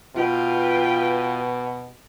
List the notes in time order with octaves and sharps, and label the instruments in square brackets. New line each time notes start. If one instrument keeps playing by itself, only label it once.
[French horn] B2 [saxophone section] F4 [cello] B4 G5